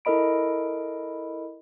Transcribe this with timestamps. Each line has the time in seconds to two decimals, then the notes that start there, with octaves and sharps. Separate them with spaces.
0.05 E4 A4 A#4 D#5 B5 D7